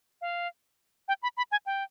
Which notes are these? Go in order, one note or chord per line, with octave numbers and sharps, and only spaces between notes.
F5
G5
B5
B5
G#5
G5